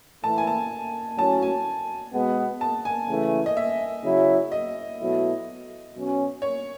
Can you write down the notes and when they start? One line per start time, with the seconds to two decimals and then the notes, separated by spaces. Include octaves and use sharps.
0.23 A2 E3 A3 E4 A5
0.38 G#5
0.47 A5
1.18 A2 F#3 C#4 A5
1.42 G#5
2.14 B2 G#3 B3
2.61 A5
2.85 G#5
3.09 C#3 E3 A3
3.46 D#5
3.57 E5
4.04 C#3 F#3 C#4 E4
4.52 D#5
5.00 B2 F#3 A3 E4
5.95 B2 F#3 C#4
6.42 C#5